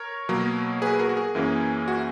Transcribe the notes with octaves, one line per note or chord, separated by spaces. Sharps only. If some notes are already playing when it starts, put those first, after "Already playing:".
Already playing: A#4 C#5
B2 F#3 A#3
G#4 B4
F#4 A#4
F#4
G#4
F#2 E3 A#3 C#4
F#4